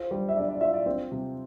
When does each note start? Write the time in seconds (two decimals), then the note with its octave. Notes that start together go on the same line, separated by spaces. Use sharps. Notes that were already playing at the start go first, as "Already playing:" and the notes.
Already playing: F4 C5
0.11 G3
0.29 E5
0.37 D4 D5
0.49 D5
0.61 F4 E5
0.73 D5
0.86 C4
1.11 C3